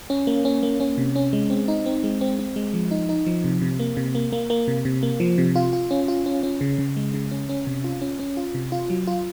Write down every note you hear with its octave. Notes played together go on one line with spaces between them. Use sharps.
C#4
A#3
C#4
A#3
C#4
C3
C#4
G#3
C4
D#4
C4
G#3
C4
C4
G#3
F3
D#4
D#4
F3
C3
C3
A#3
C3
A#3
A#3
A#3
C3
C3
A#3
F3
C3
F4
F4
C#4
F4
C#4
C#4
C#3
C#3
G#3
C#3
C#4
C#4
C3
F4
C#4
C#4
F4
C3
F4
F#3
F4